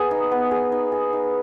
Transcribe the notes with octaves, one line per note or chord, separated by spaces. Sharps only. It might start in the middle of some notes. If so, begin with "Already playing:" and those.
Already playing: B3 G#4
D#4
B3
G#4
D#4
G#4
D#4